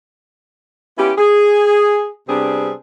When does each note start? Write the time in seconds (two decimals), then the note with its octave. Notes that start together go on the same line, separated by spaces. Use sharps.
0.98 B3 C#4 E4 F4 G4
1.18 G#4
2.28 C3 G3 B3 C4 D4 G#4